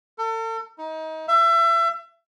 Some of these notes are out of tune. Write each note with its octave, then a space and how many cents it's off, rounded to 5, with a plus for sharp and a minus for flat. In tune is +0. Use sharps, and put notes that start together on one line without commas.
A4 +40
D#4 +30
E5 +30